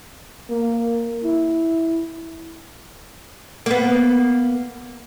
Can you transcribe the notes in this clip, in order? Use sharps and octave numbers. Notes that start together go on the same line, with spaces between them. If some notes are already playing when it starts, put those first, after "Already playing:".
A#3
E4
A#3 B3